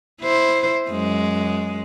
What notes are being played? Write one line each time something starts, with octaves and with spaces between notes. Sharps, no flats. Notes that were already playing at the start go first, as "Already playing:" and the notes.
E4 C5
F#2 G#3